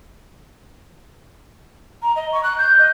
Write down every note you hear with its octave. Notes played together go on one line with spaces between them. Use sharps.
A#5
D#5
C#6
F#6
G6
D#5